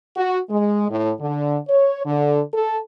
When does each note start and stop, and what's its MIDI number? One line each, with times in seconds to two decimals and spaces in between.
0.16 0.38 66
0.50 0.87 56
0.89 1.11 45
1.19 1.57 50
1.68 2.04 73
2.05 2.40 50
2.53 2.77 69